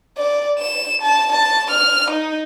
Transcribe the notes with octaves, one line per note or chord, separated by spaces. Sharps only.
D5
E7
A5
A5
F6
D#4